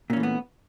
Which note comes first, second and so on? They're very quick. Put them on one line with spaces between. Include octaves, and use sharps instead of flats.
A#2 C#4 E3 A3 B3